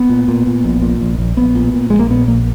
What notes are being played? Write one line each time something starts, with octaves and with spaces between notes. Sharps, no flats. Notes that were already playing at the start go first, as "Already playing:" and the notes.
Already playing: B3
A#2
A#2
A#2
A#1
A#2
A#1
A#1
A#1 B3
A#2
A#2
A#1 G#3
A#3
A#2 B3
A#1 A#3